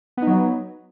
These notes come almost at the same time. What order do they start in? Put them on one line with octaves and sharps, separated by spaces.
B3 D#4 F#3